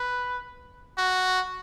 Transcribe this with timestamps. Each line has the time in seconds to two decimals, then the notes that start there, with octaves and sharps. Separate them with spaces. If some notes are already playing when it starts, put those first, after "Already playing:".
Already playing: B4
0.98 F#4